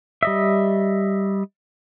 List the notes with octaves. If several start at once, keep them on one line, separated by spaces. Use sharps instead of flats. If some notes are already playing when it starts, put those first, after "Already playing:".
G3 D#5 E5